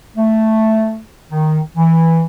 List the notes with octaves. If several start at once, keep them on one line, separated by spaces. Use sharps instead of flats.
A3
D#3
E3